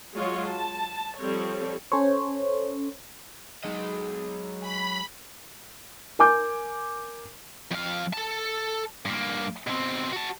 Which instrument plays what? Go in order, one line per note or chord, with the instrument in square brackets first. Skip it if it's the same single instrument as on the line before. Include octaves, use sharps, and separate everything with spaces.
[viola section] F#3 G#3 F4 C#5
A5
F3 G3 C4 A4 C#5
[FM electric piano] C#4 A4 C5 C#5
[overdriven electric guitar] F#3 D#5 [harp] G#3 D#4
[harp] G#5 [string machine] B5
[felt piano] A#4 G#5 D6 G6
[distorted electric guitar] F2 F5
A4 A5
G2 A#3
B2 C4
F#4 A5